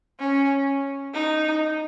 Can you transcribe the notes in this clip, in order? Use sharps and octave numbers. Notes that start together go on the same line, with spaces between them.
C#4
D#4